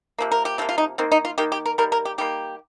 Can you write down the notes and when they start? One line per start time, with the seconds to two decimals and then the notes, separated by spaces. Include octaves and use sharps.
0.18 C3 F3 A#3
0.31 A#4
0.45 G4
0.58 C3 F3 A#3 F4
0.69 F4
0.78 D#4
0.98 D#3 A#3 C4
1.12 D#4
1.25 F4
1.38 D#3 A#3 G4
1.52 G4
1.65 A#4
1.78 D#3 G3 A#3 A#4
1.92 A#4
2.05 G4
2.18 D#3 G3 A#3 G4